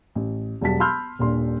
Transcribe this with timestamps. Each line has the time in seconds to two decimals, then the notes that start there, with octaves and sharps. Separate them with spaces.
0.15 A1
0.61 E1 F#3 G3 A5 B6
0.80 A5 B5 C6 E6 F6 G6
1.19 D#1 A#2 D4 C6